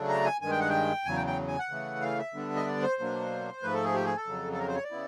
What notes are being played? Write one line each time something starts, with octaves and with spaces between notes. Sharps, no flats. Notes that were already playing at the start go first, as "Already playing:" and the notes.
Already playing: C#3 F#3 A3 D4
A#5
G#5
G2 D#3 G#3 G#5
G5
F#5
G5
E2 C#3 F#3 G#5
G5
G5
G#5
F#5
C#3 E3 A3
F5
E5
D3 G3 B3 D4
D#5
D5
C5
B2 F#3 A#3 D4
G#2 F3 A3 B4
A4
G#4
G4
G#4
A4
F2 C#3 F#3
A4
A#4
C5
C#5
D5
C#3 B3 E4